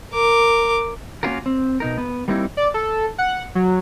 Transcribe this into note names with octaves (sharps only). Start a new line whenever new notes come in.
A#4 D6
A#3 B3 C#4 F4 F#4 A#4
C4
B2 D#4 A#4
B3
G3 A#3 C4 D#4 E4
D5
A4
F#5
F#3